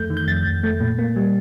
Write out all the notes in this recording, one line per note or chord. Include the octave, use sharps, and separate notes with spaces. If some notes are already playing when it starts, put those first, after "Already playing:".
Already playing: F2 A3 G6
D#3
G6
F2 A6
F2
A3
A#2
A#3
G3